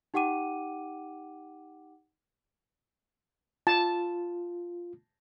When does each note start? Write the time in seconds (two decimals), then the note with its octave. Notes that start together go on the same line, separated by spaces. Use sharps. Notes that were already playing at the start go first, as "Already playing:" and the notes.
0.14 D#4 G4 F#5 G5 D6 D#7
3.67 F4 A5